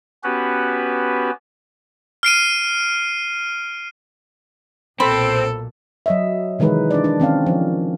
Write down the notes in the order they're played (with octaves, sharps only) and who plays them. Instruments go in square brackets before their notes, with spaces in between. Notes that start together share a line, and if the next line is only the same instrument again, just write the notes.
[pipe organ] B3 C#4 F#4 G4 B4
[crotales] F6 C7 D7 D#7
[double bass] B1 A#2 [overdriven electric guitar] C4 [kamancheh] A4 [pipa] C5 B5
[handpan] F#3 D#5 E5
C3 D#3 E3 G#3 D#4 B4
D4 D5
D4
D#3 C4 C#4 F5
F3